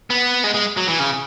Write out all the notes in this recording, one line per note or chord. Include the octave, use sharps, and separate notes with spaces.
B3
G#3
G#3
F#3
E3
C#3